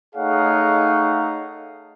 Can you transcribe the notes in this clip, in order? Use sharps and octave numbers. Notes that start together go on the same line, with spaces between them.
A3 D#4 G#4 C#5 F5 F#5